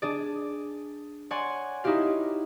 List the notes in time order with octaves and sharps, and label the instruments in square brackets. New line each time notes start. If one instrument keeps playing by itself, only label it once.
[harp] D4 G#4 D5
C#5 D5 F#5 G#5 C6
D#4 E4 F#4 G4 F5